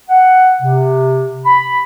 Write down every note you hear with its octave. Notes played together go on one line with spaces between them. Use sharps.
F#5
C3
B5